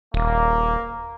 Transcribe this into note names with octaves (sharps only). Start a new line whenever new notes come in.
D#1 A#3